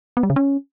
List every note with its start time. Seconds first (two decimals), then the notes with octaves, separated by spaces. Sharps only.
0.17 B3
0.23 G3
0.30 C#3
0.36 C#4